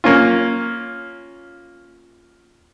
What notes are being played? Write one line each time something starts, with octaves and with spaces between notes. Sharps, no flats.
A#3 C#4 F4